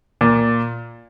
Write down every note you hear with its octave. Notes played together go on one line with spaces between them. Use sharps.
A#2